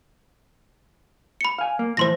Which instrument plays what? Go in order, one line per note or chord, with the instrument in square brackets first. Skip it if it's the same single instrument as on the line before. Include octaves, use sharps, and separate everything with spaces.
[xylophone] B5 C#7
[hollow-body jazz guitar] F5 G#5
A#3
[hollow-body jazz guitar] A2 E3 F3 [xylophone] C5 C6 A#6